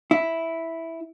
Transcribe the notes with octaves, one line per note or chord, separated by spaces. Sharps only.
E4